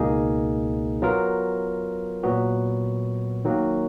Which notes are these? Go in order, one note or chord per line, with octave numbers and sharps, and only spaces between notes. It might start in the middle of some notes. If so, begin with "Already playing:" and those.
Already playing: C#2 B2 A#3 D#4 G#4
F#3 B3 F4 A#4
A#2 F#3 B3 F#4
D#3 F#3 A#3